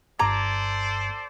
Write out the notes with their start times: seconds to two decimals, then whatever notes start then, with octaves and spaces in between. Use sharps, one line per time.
0.19 G1 G2 A4 C5 D5 A#5 D6 G#6